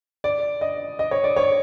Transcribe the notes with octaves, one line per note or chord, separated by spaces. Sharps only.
D5
D#5
D#5
C#5
D5
C#5